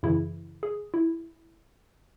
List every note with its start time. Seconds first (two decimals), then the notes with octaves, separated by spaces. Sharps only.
0.03 F#2 C#3 E3 E4
0.63 G#4
0.94 E4